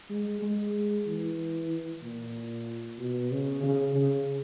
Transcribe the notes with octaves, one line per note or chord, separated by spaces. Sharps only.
G#3
G#3
E3
A#2
B2
C#3
C#3
C#3